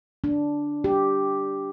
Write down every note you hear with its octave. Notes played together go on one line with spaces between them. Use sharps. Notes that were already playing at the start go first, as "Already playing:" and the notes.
D4
G4